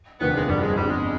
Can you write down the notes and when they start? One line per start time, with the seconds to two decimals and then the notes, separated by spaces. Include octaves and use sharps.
0.20 F1 D#2 D3 F3 B3
0.35 G#3
0.48 G1 G2 F3 G3
0.62 G#3
0.76 G1 F2 D3 G3
0.89 G#3